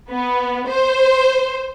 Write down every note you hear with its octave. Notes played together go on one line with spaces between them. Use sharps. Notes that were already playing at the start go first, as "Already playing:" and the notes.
B3
C5